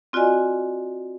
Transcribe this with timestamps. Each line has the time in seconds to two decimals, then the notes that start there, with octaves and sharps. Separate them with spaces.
0.13 C4 F4 F#4 D5 D#5 G#5